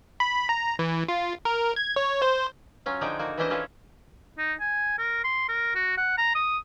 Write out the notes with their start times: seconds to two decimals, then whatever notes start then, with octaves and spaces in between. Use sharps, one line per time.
0.20 B5
0.49 A#5
0.79 E3
1.08 F4
1.45 A#4
1.76 G#6
1.96 C#5
2.22 C5
2.86 F#3 C#4 F4
3.01 D3 F3 D4 D#4 G#4 G5
3.19 A#3 D#4 F#4
3.38 E3 C#4 D4 E4 C5 D#5
3.50 C#4 E4 F4 G#4 A4
4.38 D#4
4.60 G#5
4.99 A#4
5.24 C6
5.49 A#4
5.75 F#4
5.98 F#5
6.18 A#5
6.35 D#6